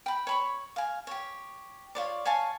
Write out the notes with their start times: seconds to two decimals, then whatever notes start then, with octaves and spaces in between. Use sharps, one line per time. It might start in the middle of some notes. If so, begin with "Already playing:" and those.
0.06 G5 B5
0.27 C#5 B5 C#6
0.76 F5 G#5
1.07 G4 C#5
1.95 F4 C#5 D5
2.25 C#5 F5 G#5 A5